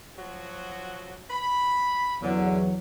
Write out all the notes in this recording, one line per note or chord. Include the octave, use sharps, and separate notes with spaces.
F3 F#3 F#4
B5
E2 D3 F#3 C#4